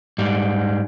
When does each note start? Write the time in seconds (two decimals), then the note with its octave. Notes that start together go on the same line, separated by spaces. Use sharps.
0.18 G#2 G3